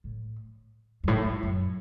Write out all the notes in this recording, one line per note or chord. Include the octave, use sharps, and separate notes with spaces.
A2
F#2
A2
A2
F#2